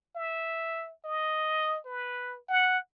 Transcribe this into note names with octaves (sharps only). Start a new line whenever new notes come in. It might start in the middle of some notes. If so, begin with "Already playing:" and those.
E5
D#5
B4
F#5